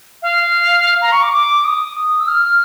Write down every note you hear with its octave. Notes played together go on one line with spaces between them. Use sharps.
F5
A#5
C#6
D6
D6
D#6
E6
F6